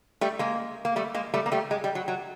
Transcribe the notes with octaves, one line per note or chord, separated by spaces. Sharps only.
G3 A3
G#3 A#3
A#3
G3 A3
G#3 A#3
G3 A3
A#3
G3 A3
G#3
G3
F#3
F#3